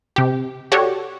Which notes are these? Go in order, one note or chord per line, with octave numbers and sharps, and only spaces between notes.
C3 G4
F#4 G4 A4 C#5 D5